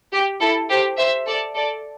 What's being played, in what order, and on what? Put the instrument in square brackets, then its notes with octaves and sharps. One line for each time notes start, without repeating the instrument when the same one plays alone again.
[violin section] G4
E4 A4
G4 C5
C5 E5
A4 D5
A4 D5